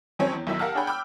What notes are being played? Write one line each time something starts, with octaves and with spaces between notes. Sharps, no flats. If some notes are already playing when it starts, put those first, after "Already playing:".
F2 D#3 F#3 C4 C#4 C#5
E2
B1 A2 D#3 F#3 E4 E6
G4 A#4 F5 F#5 A5 F6
D4 G#4 C#5 F#5 G5 B5
G5 B5 D6 E6 F6